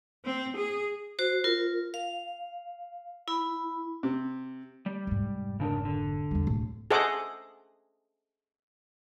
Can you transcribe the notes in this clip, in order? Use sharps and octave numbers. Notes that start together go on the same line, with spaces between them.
C4
G#4
F#4 C5
F4 A#4
F5
E4 B5
C3
G3
F1 G#2
C#3 D4 A#4
D3
E2 G3
D1
G#4 A4 C5 D#5 F#5 D6